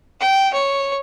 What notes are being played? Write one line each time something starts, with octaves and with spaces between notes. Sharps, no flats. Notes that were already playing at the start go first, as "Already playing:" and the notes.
G5
C#5